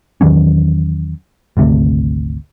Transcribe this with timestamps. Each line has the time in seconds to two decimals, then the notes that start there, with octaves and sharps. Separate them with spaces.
0.21 E2 D#3 F#3 C#4
1.57 G#1 D2 C3 A3